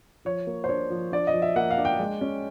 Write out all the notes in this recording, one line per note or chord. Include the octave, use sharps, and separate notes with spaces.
F3 C#5
A#3
C5
D4 C#5
F3
D4 D5
D#5
F3
E5
A#3 F#5
F5
D4
G5
G#3
C#4